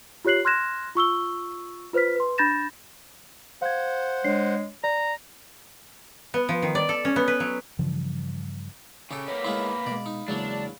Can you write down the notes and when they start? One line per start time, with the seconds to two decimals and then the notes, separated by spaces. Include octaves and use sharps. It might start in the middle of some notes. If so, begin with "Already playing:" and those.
0.25 F4 G4 C#5 F#6 C7 F#7
0.45 C6 F6 F#6 G#6 A#6 E7
0.95 F4 C#6 E6 G7
1.93 F4 B4 C5 F6 B6
2.16 B4 C6
2.38 D4 B5 G6 A6 A#6 E7
3.62 C5 F5 F#5 G#6
4.25 G#3 D4 C#5 C7
4.84 D5 A#5
6.34 B3
6.49 F3
6.62 D#3
6.75 D5
6.89 A4
7.05 C#4
7.16 B3
7.28 B4
7.40 F#3
7.79 G2 C#3 E3 F3
9.11 C#3 G4 A4
9.28 A#3 B4 C#5
9.44 G#3 B3 E4 F5 B5 C6
9.86 B2 G#3 D5
10.06 D#4
10.28 E2 C#3 F#3 G#3 A#3 D4